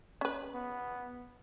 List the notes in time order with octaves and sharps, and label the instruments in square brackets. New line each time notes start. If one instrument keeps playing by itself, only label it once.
[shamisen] C#4 B4
[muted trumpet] B3